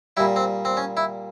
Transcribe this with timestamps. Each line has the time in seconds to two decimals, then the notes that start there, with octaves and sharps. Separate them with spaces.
0.17 A#2 G3 E4
0.36 C4
0.65 C4
0.77 C#4
0.97 E4